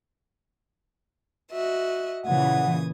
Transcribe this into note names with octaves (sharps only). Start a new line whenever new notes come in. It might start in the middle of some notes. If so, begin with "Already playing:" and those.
F#4 D#5 E5
A#2 C#3 E3 F#5 D#6 G#6